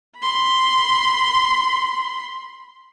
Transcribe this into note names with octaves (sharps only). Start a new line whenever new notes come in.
B5 C6